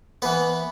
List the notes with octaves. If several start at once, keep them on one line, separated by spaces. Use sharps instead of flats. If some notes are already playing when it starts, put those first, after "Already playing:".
E3 B3 B4